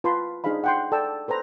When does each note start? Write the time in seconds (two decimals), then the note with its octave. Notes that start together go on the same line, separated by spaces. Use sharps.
0.04 F4 B4 A5 B5 C6
0.44 D4 D#4 G#4 C5 F5 B5
0.64 F#5 G5 C6
0.92 A4 D5 G5 A5 E6
1.28 A4 B4 C5 A#5